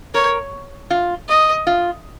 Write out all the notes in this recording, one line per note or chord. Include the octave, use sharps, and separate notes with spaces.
A#4 C#5
F4
D#5
F4